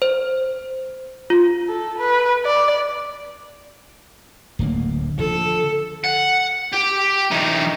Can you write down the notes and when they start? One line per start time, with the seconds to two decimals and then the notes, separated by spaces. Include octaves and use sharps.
0.02 C5
1.30 F4
1.69 A4
1.98 B4
2.45 D5
4.59 D1 D2 A#3
5.18 D3 F3 A4
6.04 F#5
6.73 G4
7.31 E3 D#4